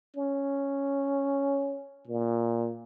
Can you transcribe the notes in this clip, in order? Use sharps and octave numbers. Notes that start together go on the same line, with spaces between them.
C#4
A#2